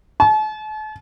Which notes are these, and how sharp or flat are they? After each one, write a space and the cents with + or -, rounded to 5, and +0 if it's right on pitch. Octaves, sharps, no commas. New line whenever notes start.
A5 -40